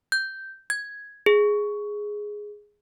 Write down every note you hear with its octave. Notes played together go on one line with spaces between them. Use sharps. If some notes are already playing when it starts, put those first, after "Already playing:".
G6
G#6
G#4